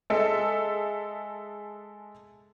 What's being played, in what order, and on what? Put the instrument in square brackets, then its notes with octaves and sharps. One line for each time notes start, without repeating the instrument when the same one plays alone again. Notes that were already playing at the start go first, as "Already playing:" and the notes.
[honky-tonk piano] G#3 A4 E5